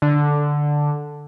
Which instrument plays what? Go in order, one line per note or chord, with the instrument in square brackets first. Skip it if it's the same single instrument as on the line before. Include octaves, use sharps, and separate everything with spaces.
[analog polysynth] D3